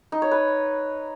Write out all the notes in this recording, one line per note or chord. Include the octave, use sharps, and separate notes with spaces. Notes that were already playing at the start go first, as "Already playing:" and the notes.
D#4
C#5
B4